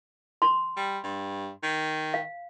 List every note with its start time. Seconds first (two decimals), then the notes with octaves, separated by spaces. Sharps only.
0.42 C6
0.77 G3
1.04 G2
1.63 D#3
2.14 F5